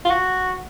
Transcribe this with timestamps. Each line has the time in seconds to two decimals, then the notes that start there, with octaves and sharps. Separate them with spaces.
0.05 F4
0.10 F#4